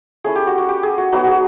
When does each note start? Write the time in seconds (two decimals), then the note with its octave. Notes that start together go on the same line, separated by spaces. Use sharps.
0.24 A3 C#4 E4 G#4
0.35 G4
0.47 F#4
0.58 F#4
0.69 G4
0.83 G#4
0.98 F#4
1.12 F#3 B3 D#4 F#4
1.27 G#4